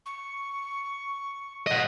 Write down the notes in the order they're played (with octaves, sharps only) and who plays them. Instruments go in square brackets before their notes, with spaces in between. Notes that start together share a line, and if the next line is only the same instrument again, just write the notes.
[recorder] C#6
[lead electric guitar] D#5 F#5